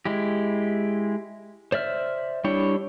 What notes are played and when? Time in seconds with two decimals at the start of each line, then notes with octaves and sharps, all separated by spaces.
0.05 G#3 E4 G4
1.72 C5 D5 E5 F6
2.44 G3 D4 E4 C#5 G5